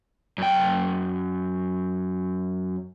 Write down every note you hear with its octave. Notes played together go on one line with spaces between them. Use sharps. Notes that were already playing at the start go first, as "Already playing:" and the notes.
F#2 G5